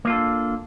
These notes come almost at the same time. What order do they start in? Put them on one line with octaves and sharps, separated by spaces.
A#3 F4 A4 D4